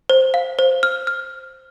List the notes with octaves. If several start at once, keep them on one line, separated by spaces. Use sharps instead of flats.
C5
F5
C5
F6
F6